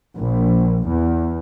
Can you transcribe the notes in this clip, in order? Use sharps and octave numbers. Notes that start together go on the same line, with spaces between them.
A#1
E2